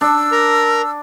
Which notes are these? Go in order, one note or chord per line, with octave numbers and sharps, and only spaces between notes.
D4 E6
A#4 A#5